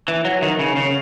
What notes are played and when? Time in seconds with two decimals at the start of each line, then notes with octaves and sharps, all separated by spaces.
0.08 E3
0.25 F#3
0.42 D#3
0.59 C#3
0.76 C#3